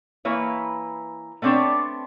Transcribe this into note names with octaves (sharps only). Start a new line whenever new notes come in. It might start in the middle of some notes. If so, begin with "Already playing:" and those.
E3 A#3 E4 B4 C#5
A3 B3 C4 D4 C#5